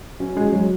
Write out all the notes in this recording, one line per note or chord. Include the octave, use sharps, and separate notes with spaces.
F#3 C#4
G#3
F#3 G#3